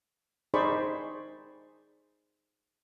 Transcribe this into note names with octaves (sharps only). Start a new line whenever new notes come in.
D#4 G#4 C5 D5 B5 C#6